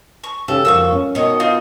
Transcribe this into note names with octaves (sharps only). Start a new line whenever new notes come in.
C#6
C#3 C#4 G4 A4
F2 A#3 F4 F5 C#6 D#6 E6
C#4
B2 D#3 C#5 D#5
D#4 F4